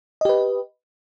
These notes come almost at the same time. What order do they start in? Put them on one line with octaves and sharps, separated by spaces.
D#5 G4 B4